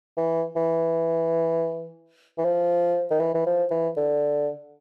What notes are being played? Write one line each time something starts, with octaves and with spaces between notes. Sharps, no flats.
E3
E3
E3
F3
D#3
E3
E3
F3
E3
D3